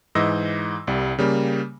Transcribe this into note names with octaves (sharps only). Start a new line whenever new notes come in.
G#2 E3 D#5 E6 A#6
C2 G3
C#3 G3 A#3